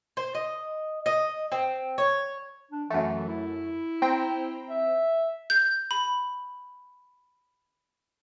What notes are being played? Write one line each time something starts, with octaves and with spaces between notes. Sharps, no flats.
C5
D#5
D#5
C4
C#5
D4
F#2 E3 A3
E4
C4 G5 A#5
E5
G6
B5